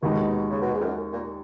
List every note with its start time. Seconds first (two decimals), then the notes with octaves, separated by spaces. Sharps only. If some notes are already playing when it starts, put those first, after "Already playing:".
0.02 D#2 B2 D#3 G#3 D#4
0.50 C#3
0.61 B2
0.73 G#2
0.80 F2
0.84 F#2
1.13 A#2